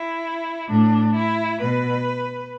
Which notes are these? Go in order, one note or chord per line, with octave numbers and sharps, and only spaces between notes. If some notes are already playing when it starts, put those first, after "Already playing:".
Already playing: E4
A2 D4
E4
B2 B4